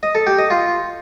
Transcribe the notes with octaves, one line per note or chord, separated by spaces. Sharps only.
D#5
A4
G4
D#5
F4